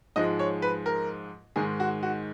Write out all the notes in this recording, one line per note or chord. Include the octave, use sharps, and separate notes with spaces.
G#2 F3 G#3 D#5
C#5
B4
A#4
G#2 D#3 G#3 G#4
F#4
F#4